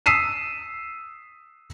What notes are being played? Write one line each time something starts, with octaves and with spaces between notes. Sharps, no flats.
D#6 E6 B6 C7 D#7 E7